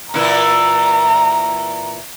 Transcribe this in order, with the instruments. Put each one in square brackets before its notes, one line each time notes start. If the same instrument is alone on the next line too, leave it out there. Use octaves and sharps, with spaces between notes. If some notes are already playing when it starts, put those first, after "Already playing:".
[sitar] A#2 E3 E4 [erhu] A#5